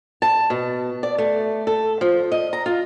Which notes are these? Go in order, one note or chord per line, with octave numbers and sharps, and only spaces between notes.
A5
B2
D5
A3
A4
F3
D#5
A#5
F4